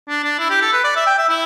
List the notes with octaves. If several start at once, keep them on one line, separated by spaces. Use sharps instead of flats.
D4
D4
E4
G4
A4
B4
D5
E5
G5
E5
E4